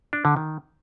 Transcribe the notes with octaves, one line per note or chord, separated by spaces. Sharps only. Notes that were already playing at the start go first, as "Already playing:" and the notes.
D4
D3
D#3